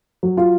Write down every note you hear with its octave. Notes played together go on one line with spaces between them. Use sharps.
F#3
F4